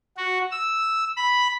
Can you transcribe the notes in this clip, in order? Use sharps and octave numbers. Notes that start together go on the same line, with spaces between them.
F#4
E6
B5